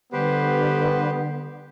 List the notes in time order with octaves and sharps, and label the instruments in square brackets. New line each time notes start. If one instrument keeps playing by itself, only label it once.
[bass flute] D3 [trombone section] G3 B3 [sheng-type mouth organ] G4 B4 C5